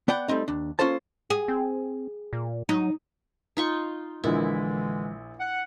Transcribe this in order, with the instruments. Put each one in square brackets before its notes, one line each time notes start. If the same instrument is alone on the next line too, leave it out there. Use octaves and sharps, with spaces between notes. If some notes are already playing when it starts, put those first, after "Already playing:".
[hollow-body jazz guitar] B3 D5 F#5 G5
G3 A3 C4 D#4
D#2 D4
A#3 C#4 F4 A4 C5 A5
[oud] G#4
[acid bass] C4
A#2
[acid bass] F#3 [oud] D#4
[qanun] D#4 F4 C#6
[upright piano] A#1 A#2 [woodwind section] D3 E3 G#3 [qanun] E4
[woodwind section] F#5